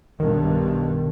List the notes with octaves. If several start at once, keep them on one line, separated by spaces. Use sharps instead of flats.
B1 G2 B2 D#3